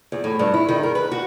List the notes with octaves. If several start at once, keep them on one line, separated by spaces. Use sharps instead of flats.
E2
A2
G2
E4
D#3
A#4
B4
F#4